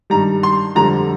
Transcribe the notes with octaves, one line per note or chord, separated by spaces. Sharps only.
G2 D#3 G3 A#5
C6
F2 D3 G3 A#5